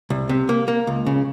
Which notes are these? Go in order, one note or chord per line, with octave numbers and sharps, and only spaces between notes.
C2
C3
A#3
A#3
C#2
C#3